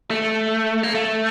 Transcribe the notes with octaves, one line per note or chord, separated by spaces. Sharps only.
A3
A#3
A3